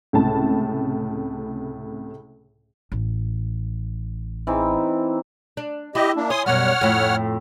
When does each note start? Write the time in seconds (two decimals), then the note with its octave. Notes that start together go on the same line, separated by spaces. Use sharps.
0.13 C#2 A2 C3 A5
2.92 A1
4.47 E3 C4 D#4
5.57 D4
5.95 E4 G4 D#5
6.16 A#3 D4
6.30 C#5 G#5 C6 D#6
6.46 F#2 B2 G3 C#5 F#5 F6
6.81 F2 A2